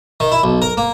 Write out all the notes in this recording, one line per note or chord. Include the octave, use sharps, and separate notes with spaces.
D#3
E4
B1
A#4
A#3